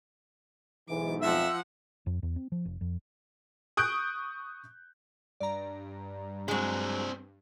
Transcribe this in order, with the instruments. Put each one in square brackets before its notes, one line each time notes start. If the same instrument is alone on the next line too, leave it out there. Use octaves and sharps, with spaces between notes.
[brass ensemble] B1 G#2 [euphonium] E3 [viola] D6
[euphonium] F2 [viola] F3 F#5 [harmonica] E5 E6
[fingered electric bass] F2
E2
C4
F3
F1
F2
[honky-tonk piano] C#6 D#6 F#6 G6 D7
[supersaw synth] G2 [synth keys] D5 A#5
[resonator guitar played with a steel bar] F#3 G#3 [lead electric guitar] C4 D4